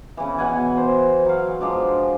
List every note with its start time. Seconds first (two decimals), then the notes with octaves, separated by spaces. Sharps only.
0.17 C#3 E3
0.38 B2 F#5 G#5
0.77 C5
1.25 F#3 F5
1.61 F3 G#3 D4